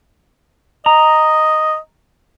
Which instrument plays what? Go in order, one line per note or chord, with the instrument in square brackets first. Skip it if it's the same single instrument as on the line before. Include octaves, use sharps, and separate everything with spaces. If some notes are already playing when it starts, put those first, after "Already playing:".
[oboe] D#5 [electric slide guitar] A#5